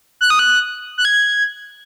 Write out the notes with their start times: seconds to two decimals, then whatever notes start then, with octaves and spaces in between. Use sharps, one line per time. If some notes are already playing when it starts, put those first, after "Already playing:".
0.21 F#6
0.30 D#6
0.39 F#6
0.98 F#6
1.05 G#6